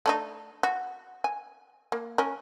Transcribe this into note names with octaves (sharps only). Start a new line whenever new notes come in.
A3 D4 D#4
F#4
G#5
A#3
C#4 A#4